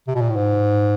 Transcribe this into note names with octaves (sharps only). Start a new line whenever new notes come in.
C3
B2
A#2
A2
G#2